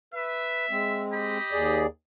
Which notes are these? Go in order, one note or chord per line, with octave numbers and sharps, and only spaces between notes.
B4 E5
G#3 C4
G4 D#5 B5
D#2 G#4 D5